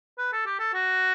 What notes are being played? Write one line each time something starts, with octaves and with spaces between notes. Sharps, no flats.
B4
A4
G4
A4
F#4